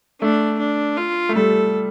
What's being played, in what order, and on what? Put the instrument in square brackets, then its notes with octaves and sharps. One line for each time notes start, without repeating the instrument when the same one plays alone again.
[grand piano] A3 [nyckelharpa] D4
[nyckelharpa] D4
F4
[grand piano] A3
[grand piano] G3 [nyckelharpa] A4